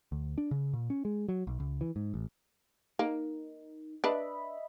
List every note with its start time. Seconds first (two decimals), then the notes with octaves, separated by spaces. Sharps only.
0.12 D2
0.38 D4
0.51 C#3
0.73 A#2
0.90 C#4
1.05 G#3
1.28 F#3
1.47 B1
1.60 C#2
1.81 E3
1.96 G#2
2.14 A1
2.99 A#3 D#4
4.04 D4 B4 D#5 E5 B5